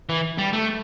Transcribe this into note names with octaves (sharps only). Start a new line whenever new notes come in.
E3
G3
A3